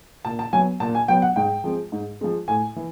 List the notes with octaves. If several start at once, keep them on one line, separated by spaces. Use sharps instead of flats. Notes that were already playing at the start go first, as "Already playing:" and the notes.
A#2 A5
A5
F#3 B3 G#5
A#2 A5
G#5
F#3 B3 G5
F#5
G#2 G5
F3 G#3 C4
G#2
F3 G#3 C4
A2 G#5
E3